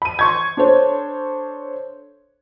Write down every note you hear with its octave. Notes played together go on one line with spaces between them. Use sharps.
B5 D#7
C6 C#6 G#6
D4 A4 C5 C#5